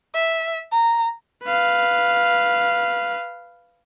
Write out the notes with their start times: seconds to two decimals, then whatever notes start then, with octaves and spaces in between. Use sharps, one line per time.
0.14 E5
0.72 A#5
1.44 B4 F5